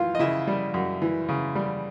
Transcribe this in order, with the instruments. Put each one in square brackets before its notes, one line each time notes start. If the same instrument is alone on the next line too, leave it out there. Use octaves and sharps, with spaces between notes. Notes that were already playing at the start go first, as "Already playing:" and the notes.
Already playing: [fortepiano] F#2 E3 F4 F5
D#5
C#3 E4 E5
G3
F#2
E3
C#3
G3